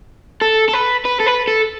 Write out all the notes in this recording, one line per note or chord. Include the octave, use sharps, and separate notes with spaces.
A4
A4
B4
B4
A4
B4
A4